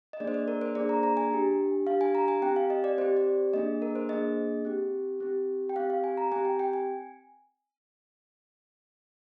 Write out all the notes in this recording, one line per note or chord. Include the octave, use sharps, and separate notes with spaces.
D#5
A#3 D4 G#4 D5
C5
D5
A#4
C5
A#3 D4 G#4 D5
A#5
A#5
G#5
D4 G4
D4 G4 F5
G#5
A#5
G#5
C4 G4 G5
F5
D#5
D5
C4 G4 C5
D5
A#3 D4 G#4 D#5
A#4
C5
A#3 D4 G#4 D#5
C4 G4
C4 G4
G5
C4 G4 F5
F5
G#5
A#5
C4 G4 G#5
G5
G5
G#5